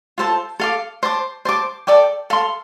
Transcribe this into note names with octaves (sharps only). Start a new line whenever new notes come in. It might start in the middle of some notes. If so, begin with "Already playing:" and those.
F4 A4 C5 A5
A4 F5 D6
C5 A5 D6
C5 A5 D6
A4 D5 G5 D6
A4 F5 C6